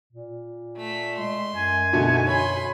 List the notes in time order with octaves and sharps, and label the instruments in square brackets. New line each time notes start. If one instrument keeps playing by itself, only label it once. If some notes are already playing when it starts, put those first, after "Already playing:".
[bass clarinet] A#2
[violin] A3 B6
[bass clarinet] G#3 [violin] C6
[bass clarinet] F#2 [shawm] G#5
[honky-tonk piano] B2 D3 A3 [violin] D#4
[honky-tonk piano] C#5 [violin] B5 C6